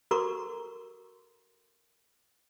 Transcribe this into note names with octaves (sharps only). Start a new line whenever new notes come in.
F#4 A4 A#4 A#5 C#6 D6